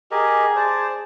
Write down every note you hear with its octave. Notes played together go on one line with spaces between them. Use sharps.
G4 G#4 A#4 D#5
C5 D5 A5